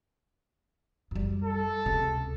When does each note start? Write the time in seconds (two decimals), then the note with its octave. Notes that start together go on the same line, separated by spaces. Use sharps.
1.11 F#2 G3
1.44 A4
1.86 C#2 C3